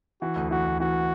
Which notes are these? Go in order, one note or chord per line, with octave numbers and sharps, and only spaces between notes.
E3 F#4
D2
E3 F#4
D2
E3 F#4